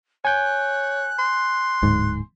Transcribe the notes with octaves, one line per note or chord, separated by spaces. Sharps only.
C#5 G#5 F#6 G6
C6
D1 G#2